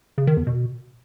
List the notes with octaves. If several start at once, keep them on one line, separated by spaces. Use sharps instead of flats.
C#3
D#3
E2
B2